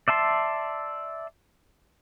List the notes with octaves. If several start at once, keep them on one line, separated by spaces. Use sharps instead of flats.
D5 E5 A5 C6